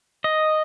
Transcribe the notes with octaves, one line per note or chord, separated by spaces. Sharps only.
D#5